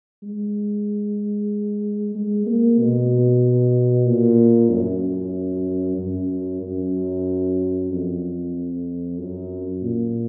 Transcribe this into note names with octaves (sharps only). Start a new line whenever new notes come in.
G#3
G#3
A#3
B2
A#2
F#2
F#2
F#2
F2
F#2
A#2